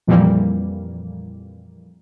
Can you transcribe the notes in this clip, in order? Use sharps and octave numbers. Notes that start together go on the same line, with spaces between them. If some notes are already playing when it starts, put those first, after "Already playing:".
F2 A#2 E3 G3 A#3